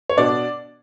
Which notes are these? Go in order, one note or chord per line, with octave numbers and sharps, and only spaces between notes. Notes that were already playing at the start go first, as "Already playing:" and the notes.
C#5
B2 D4 D5